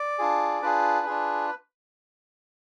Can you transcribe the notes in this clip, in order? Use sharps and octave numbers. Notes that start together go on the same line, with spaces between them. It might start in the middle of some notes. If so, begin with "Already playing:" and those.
Already playing: D5
D4 F4 G#4
D4 F4 G#4 B4
D4 F4 G#4